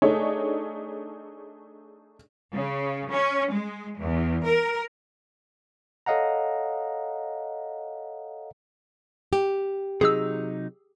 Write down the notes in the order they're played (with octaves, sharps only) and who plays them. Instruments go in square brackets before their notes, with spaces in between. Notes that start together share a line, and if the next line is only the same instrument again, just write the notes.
[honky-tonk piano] A3 D4 D#4 G#4 C#5
[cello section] C#3
C#4
G#3
E2
A#4
[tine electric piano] A4 C#5 D#5 F5 F#5 A#5
[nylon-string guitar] G4
[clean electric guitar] C3 F#3 D#4 [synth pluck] G#4 E6